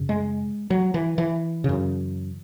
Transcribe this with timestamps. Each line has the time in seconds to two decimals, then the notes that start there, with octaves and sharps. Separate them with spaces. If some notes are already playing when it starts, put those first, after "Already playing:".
Already playing: F#2 C#3
0.09 G#3
0.70 F#3
0.94 E3
1.18 E3
1.64 F#2 C#3